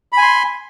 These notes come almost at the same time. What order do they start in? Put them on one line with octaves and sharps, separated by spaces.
B5 G#5 C6